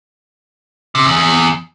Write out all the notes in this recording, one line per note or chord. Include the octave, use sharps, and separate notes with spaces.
C3
E2
E2